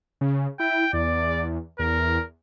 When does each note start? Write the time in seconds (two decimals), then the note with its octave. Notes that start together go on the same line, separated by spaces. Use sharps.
0.21 C#3
0.60 E4 G5
0.93 E2 D5
1.79 E2 A#4